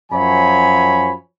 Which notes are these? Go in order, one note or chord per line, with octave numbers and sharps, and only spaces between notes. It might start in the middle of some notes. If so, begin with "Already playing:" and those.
F#2 F3 C#5 G#5 B5